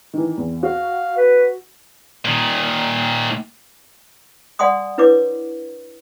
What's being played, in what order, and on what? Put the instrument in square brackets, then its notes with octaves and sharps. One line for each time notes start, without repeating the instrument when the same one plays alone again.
[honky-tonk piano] D#3 E3
E2
[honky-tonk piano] F#4 [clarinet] F5
[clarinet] B4
[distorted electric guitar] A#2 D#3
[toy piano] D5 F#5 G#5 C6 D#6
D4 E4 B4 C#5 D6